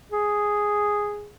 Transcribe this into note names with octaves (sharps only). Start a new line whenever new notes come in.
G#4